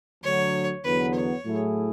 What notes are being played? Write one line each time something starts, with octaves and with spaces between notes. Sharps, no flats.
D2 D3 F#3 C#5
E2 D3 F#3 B3 B4
C#5
A2 F#3 A3 E4 G#4